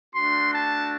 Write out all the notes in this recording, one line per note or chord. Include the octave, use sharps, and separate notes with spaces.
A3 D4 F#4 C6
A5